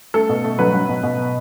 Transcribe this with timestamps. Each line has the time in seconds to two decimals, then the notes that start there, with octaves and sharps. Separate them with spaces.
0.14 A3 A4
0.29 B2
0.44 A3
0.59 F#3 B4
0.74 F#3
0.89 B2
1.03 B2